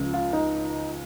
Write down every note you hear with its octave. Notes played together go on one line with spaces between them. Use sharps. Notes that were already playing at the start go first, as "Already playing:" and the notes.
Already playing: C#2 C#3 F3
F4
D#4